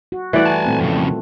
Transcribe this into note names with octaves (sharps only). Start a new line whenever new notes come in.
F#4
E3 G3 A3 F#4 D5 F#5
G#5 A5
A#2 A3 C4
F2 C#3